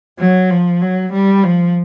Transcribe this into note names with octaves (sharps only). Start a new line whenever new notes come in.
F#3
F3
F#3
G3
F3